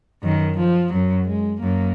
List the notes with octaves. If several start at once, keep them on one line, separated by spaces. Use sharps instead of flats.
F#2 D#3
F3
F#2 F#3
G#3
F#2 A#3